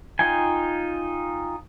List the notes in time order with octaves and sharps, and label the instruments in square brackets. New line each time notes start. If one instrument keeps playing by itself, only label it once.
[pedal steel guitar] D#4 F4 G5 G#5